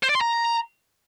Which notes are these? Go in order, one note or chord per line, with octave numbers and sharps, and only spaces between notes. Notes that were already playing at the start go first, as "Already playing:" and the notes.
C5
D5
C6
A#5